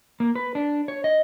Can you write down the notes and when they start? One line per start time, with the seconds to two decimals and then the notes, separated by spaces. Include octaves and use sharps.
0.20 A#3
0.36 B4
0.55 D4
0.88 C#5
1.04 D#5